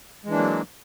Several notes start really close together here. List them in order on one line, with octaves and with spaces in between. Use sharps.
G#3 E3 D4 A#3 F#3